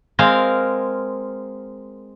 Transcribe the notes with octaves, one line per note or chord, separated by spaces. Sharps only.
G#3 C4 A#4 F5